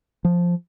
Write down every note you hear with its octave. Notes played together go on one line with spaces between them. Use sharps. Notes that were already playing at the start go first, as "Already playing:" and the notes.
F3